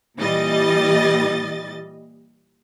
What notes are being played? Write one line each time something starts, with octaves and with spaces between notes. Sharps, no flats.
A#2 E3 G3 D#5 A6